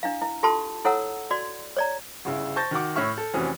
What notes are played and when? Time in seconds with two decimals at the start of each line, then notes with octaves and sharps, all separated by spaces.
0.03 D4 E4 F5
0.21 E4
0.43 F4 G4 A4 A5 C6
0.85 E4 A4 C#5 F#5 A#5 E6
1.31 F#4 D5 C6
1.77 C#5 D5 A#5
2.25 G1 C#3 E4
2.56 C5 A5 C#6 G6 A6 A#6
2.71 D#3 F#4 F#5 D6
2.96 A2 C#5 E5 C#6 F6
3.18 A4
3.33 F1 E3 C4 C#4 F#4 D#6